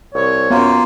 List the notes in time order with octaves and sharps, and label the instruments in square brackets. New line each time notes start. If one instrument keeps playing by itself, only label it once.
[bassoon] C2 [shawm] C#5
[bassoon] F#2 [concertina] A#3 F4 [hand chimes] B3